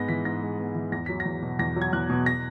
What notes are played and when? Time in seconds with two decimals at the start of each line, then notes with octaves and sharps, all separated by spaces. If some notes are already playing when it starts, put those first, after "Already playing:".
Already playing: G#2 G#3 B3 A#6
0.08 E3 B6
0.25 G#2 A#6
0.42 G#3
0.59 B3
0.75 E3
0.92 E2 A#6
1.06 F#3 B6
1.20 A#6
1.25 E2
1.42 B2
1.59 E2 A#6
1.76 F#3
1.82 G#6
1.93 E2 F#6
2.10 B2
2.26 A#6